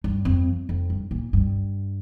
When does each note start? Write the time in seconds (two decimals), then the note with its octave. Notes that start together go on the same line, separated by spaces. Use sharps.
0.04 G2
0.25 F2
0.69 F2
0.90 G2
1.11 A#2
1.33 G2